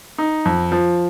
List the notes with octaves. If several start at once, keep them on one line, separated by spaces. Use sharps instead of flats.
D#4
F2
F3